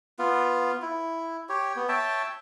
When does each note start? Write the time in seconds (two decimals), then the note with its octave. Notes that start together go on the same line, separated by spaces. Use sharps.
0.19 B3 F4
0.82 E4
1.49 G4 C#5
1.76 B3
1.89 C#5 E5 G5 A5